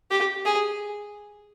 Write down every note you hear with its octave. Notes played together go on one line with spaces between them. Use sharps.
G4
G#4